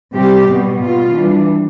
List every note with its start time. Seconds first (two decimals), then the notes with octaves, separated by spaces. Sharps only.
0.14 C3 G3 C4 G4
0.48 B2 G3 B3
0.81 B2 B3 F4
1.14 E3 G3 D4